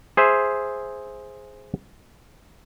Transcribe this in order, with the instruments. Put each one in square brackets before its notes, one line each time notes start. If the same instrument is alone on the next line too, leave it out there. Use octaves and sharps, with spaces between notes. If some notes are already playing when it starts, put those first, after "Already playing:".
[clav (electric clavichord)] G#4 C5 E5